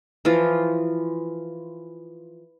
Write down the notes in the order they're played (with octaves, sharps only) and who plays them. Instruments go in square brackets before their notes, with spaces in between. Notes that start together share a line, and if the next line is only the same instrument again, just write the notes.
[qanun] E3 F3 F4